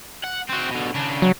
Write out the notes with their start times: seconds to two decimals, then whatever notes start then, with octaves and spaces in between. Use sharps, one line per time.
0.24 F#5
0.49 C4 F#4
0.70 B2 D3
0.94 C#3 D4
1.22 F#3